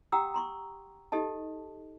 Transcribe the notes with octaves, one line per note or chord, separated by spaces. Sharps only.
G4 F#5 G5 A#5 D#6 E6
A#5 C6 C#6
D#4 G4 A4 D#5 A5